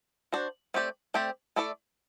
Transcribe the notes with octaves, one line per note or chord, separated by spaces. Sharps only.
D4 F#4 C5
A3 C4 G4 D5
A3 C4 G4 D5
A3 E4 A4 D5